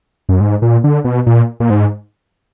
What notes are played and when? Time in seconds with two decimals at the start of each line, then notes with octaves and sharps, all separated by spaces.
0.29 F#2
0.41 G#2
0.62 A#2
0.84 D3
1.04 B2
1.26 A#2
1.60 A#2
1.70 G#2